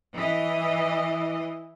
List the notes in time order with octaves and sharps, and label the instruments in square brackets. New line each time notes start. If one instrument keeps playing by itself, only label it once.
[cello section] E3 D#5